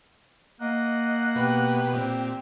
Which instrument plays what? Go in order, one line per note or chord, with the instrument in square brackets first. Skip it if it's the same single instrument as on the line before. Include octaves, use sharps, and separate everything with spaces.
[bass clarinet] A#3 [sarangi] D#5 [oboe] F#5
[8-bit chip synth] B2 B4 [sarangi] G4
[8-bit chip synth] A#2 C4